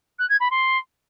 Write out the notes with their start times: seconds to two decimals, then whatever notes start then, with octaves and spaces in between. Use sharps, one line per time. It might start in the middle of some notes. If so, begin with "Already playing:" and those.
0.19 F#6
0.30 G#6
0.40 B5
0.51 C6